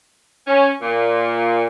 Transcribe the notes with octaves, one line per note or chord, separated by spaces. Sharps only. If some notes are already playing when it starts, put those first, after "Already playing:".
C#4
A#2